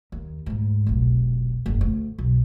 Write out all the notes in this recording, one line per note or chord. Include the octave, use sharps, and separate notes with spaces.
D#2
D2 G#2
F1 B1
F#1 G2
D2
B1